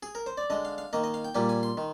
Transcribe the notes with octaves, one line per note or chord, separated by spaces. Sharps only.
G#4
A#4
C5
D5
D3 G#3 D#5
F5
F5
D#3 A#3 D#5
D#5
F5
G5
A#2 G3 A#3 G#5
G#5
C6
D#3